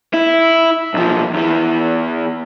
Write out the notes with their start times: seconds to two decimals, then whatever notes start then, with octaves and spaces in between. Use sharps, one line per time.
0.14 E4
0.94 B1 F3
1.34 E2 E3